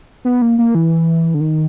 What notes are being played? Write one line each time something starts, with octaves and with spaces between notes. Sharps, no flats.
B3
A#3
A#3
E3
D3
D#3